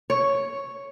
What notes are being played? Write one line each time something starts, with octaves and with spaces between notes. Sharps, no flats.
C#5